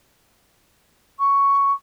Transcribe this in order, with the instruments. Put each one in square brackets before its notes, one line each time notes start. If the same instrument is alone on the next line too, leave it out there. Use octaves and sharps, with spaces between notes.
[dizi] C#6